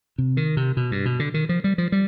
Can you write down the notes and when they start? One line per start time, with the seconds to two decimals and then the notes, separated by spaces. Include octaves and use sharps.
0.18 C3
0.37 D#3
0.57 C3
0.77 B2
0.91 G2
1.05 B2
1.20 D3
1.34 D#3
1.49 F3
1.64 G3
1.78 F3
1.92 G3